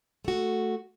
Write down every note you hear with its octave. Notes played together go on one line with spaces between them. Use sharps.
A3 F#4